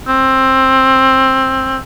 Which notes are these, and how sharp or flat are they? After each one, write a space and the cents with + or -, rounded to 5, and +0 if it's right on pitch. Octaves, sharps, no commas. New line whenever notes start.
C4 +15